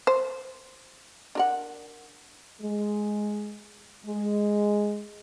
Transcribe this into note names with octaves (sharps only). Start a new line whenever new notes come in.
C5
D4 A#4 F#5
G#3
G#3